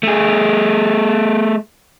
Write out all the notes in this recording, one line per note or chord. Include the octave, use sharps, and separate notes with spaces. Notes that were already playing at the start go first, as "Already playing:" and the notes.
A3 G#4